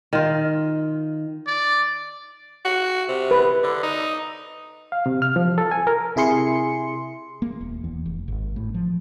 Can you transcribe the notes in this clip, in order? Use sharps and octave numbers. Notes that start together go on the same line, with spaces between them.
D#3 F4
D5
F#4
C3
B4
D3
D#4
F5
C3
F6
F3
A4
G#5
A#4
C3 E4 G#4 C6 C#7
A#3
E1
E2
F1
G#1
A2
F3